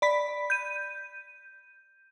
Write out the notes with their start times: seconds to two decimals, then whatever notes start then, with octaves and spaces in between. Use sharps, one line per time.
0.02 D5 B5 B6
0.50 G6 D#7